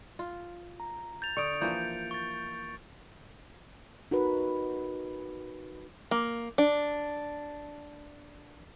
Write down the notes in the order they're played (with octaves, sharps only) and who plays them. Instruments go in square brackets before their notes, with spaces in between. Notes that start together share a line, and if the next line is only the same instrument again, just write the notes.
[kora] F4
[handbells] A#5
[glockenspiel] G6 A6 F7
[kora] D3 [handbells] C#6 D#6 [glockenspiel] C#7 D7
[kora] E3 F3 A#3 [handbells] G6
[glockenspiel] C#6 A6
[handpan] D#4 F#4 A#4 B4
[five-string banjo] A#3
D4